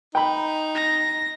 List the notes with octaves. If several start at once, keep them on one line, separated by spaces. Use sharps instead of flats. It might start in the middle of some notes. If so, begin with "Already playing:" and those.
D#4 G5 B5
A#6